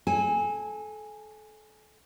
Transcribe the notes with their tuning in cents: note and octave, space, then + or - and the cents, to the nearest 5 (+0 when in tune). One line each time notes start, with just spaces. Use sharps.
A4 -30 G#5 -10